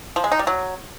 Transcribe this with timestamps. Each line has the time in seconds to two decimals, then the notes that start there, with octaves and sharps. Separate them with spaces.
0.16 F3
0.24 G#3
0.32 D#4
0.39 G3
0.47 F#3